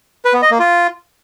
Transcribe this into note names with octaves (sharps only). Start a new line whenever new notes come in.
B4
B3
D#5
A#3
F4